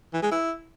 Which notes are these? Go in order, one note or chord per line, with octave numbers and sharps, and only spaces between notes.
E3
G#3
E4